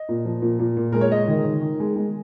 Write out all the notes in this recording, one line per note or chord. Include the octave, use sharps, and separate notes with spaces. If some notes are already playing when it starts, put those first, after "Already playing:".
Already playing: D#5
A#2
F3
A#2
A#2
A#2
G#3 A#4
C#5
G#3 D#5
D#3
D#3
D#3
G#3
G#3